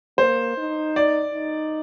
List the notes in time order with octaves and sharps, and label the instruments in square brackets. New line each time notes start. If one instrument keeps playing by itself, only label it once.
[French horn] A#3 [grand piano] C5
[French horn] D#4
[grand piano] D5
[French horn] D#4